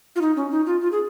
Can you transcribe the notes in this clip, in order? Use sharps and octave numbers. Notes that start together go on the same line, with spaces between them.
F4
D#4
C#4
D#4
F4
F4
G#4